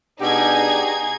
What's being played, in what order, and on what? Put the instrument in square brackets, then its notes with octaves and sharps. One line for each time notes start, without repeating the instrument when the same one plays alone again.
[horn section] B2 D4 G4 [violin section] D#4 G#4 G#6